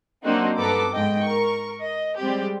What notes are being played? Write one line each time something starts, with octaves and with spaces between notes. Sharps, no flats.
F#3 A#3 C4 D4 D#4 F#4
G2 B3 A4 B4 A#5 D6
G#2 D#5 G5
A#4 C#6
D#5
G3 G#3 C4 G4